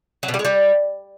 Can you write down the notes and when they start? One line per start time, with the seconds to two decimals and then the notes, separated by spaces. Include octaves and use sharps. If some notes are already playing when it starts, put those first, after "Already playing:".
0.23 F#3
0.28 B2
0.34 G3
0.39 G#3
0.45 G3